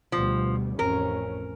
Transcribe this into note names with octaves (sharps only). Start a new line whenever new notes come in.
D2 B2 F3 G3
A1 F2 C#4 A#4